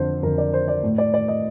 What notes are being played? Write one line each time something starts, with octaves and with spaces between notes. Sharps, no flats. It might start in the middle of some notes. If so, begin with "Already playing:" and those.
Already playing: F2 D3 C5
F2 D3 A#4
D5
C5
D5
A2
D5
D5
D#5